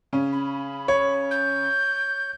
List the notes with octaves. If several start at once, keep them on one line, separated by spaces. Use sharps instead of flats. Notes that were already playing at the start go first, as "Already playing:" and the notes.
C#3 C#4
B5
C#5
G6